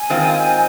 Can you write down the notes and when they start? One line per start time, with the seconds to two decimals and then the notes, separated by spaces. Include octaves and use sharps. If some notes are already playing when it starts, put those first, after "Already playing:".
Already playing: G#5
0.10 D#3 G#3 C4 F4